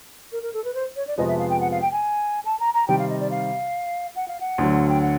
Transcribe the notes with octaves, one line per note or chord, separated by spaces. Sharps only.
A#4
A#4
A4
B4
C5
C#5
D5
F2 C3 F3 G#3 B3 D#5
E5
F5
G5
F#5
F5
G5
G#5
A5
A#5
A#5
C3 D#3 G3 G5
F5
D#5
D5
F5
F#5
F5
F#5
D2 D3 F#3
G5
F#5